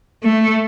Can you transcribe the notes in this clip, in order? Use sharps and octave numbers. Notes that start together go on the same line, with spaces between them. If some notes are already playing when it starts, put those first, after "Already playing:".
A3